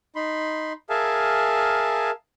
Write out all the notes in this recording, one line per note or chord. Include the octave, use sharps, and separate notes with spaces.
D#4 B5 C6
G#4 A#4 E5 F5 G#5 A5